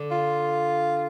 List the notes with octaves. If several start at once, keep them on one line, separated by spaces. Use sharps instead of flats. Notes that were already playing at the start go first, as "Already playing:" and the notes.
Already playing: D3
F4